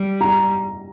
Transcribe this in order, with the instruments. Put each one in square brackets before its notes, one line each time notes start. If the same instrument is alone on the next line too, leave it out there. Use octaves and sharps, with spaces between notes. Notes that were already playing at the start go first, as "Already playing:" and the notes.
Already playing: [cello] G3
[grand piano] A#5